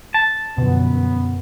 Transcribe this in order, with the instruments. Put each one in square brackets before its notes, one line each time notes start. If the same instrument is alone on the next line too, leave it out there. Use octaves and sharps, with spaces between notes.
[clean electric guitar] A5
[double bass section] F#2 [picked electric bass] B2 D3 F3 [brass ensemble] B3